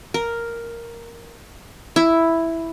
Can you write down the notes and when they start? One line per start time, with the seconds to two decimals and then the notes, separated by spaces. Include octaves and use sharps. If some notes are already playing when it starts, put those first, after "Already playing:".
0.14 A#4
1.96 E4